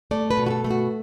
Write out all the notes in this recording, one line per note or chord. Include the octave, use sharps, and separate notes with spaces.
A3 D5
B4
B2
F#4
A4
A3
F#4